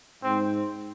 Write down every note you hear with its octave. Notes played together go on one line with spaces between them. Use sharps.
G#2 C4